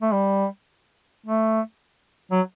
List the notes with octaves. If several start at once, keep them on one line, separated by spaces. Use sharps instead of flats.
A3
G3
A3
F#3